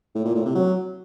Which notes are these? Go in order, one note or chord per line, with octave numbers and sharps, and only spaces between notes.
A2
A#2
A2
C3
F#3